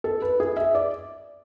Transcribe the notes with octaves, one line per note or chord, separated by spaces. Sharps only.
A4
B4
G#4
E5
D5